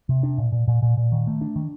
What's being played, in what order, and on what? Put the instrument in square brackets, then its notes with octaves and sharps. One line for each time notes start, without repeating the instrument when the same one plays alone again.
[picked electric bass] C3
D4
A#2
A#2
A#2
A#2
A#2
D#3
A3
D4
D#3